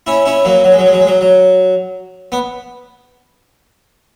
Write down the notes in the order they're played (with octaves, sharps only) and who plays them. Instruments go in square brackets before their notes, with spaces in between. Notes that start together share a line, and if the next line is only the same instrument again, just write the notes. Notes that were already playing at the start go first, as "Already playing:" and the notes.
[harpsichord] C#4 E4
C#4 E4
F#3 A#3
F#3
G#3
F#3
G#3
F#3
G#3
F#3
F#3
B3